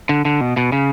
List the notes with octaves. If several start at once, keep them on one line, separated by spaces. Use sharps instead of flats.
D3
D3
B2
B2
C#3